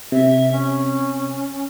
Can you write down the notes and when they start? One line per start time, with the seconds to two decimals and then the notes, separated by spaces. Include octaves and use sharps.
0.12 C3 E5
0.52 C#4